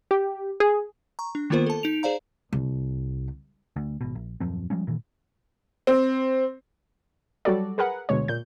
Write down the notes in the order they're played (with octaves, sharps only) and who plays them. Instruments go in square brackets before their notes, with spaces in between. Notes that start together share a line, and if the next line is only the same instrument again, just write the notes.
[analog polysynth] G4
G#4
[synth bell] A#5 C#6
D4
D#3 A#3 B3 F4 A#4 C5
A4 A5
D#4 D7 F7
G#4 C5 D5 F5 A#5
[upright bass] C2
[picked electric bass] D2
G#1 B2
A#1
D#1 F#2 F3 C4
F3 G3 G#3 C#4
G2 A#2 D#3 E3
[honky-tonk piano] C4
[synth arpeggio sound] F#3 G3 F#4 A4 D5
G#4 A#4 B4 F#5
D2 B2 G#3 C#5
A#2 G6